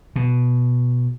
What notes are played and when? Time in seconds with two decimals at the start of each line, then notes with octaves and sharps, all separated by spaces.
0.16 B2